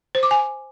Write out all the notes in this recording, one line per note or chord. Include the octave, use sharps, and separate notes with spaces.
C5
D6
G#5